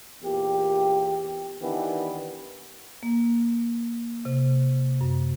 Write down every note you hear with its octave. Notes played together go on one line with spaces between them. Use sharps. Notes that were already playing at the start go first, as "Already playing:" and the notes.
E2 A#2 G4
D#3 E3 B3 D4 G4
A#3
C3
F#2